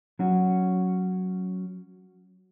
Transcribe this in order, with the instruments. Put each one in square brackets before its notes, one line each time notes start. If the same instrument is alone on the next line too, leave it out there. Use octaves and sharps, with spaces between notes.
[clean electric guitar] F#3 C#4 F#4